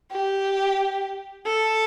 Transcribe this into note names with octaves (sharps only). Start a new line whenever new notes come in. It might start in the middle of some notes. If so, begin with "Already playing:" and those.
G4
A4